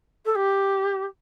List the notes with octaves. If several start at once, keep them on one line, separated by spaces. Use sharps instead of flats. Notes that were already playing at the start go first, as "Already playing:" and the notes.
A4
G4